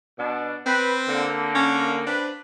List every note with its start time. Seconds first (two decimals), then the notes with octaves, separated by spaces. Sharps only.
0.18 B2 D4
0.66 C4 B4
1.08 D3 A#3
1.55 C#4
2.07 C4 D4 B4